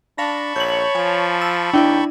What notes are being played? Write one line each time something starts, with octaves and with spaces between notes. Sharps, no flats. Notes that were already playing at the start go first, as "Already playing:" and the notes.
D4 F5 A5 B5 C#6 A#6
A#1 C#5 G6 F#7
F3 G#5
E6
D#2 D4 E4 D5 G5